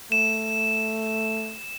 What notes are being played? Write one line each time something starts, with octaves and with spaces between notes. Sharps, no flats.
A3 E7